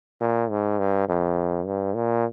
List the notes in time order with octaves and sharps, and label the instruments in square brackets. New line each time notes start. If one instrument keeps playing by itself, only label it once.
[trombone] A#2
G#2
G2
F2
G2
A#2